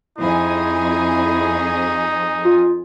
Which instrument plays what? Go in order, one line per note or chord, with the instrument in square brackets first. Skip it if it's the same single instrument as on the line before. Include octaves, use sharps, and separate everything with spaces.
[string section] F2 G#4 [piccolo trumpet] D#4 [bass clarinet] E4
[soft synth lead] F4